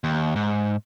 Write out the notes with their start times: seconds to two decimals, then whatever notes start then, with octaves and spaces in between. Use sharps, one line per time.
0.04 D#2
0.36 G#2